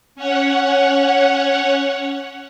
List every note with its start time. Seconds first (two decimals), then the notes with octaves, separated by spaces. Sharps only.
0.15 C#4 C#5 F#5